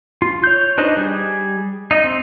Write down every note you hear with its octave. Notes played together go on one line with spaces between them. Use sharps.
F4
C#5 G6
D4 D#4 B4 C5 D#5
G3 G#4
D#4 D#5
C4